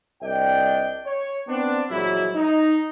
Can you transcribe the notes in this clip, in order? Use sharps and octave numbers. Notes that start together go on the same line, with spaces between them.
C2 D4 D#5 G5
C#5
B3 C4 D4
A#1 E3 F#3 G#3 E4
D#4